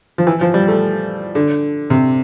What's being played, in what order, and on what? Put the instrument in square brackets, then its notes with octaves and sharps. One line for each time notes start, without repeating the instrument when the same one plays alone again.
[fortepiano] F3
E3
F3
G3
A3
D3
C3